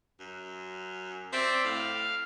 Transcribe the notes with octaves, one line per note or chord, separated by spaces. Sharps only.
F#2
C4 D5 E5 G5
A2 F5